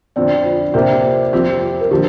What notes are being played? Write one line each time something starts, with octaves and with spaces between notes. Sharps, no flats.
F2 D3 F3 C4 D5
F4
C3 A#3 G4
F2 F3 C4 G4
A#4
D3 F3 G4